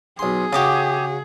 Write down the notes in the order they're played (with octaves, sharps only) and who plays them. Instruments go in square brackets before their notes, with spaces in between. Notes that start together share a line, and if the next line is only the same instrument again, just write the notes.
[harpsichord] B1 C6 [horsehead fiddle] G#4
[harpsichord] C#3 F#4 [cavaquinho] G4 D6 D#6